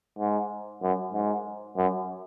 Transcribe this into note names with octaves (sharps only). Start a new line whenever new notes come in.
G#2
F#2
G#2
F#2